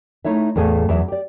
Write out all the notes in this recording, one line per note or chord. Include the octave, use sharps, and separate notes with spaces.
A3 D#4 E4 C#5 E5
E2 A2 A3 G#4 D5 F5
E2 F#3 G#4 E5
G4 D5